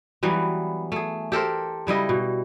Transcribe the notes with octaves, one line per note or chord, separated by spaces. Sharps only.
E3 F#3 G3 B3
A3 G#4
G4 A4 A#4 C5
C#3 G3 E4 D#5
B2